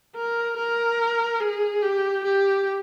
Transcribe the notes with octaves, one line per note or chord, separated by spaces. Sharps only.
A#4
A#4
G#4
G4
G4